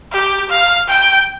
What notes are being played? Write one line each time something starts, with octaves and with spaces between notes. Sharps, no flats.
G4
F5
G5